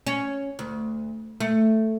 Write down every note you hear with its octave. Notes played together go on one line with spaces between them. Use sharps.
C#4
D2
A3